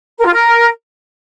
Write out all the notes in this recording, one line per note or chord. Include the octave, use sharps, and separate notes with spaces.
A#4
F4
A#4